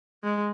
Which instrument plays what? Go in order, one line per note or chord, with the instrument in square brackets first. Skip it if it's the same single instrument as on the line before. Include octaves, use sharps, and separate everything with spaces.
[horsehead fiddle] G#3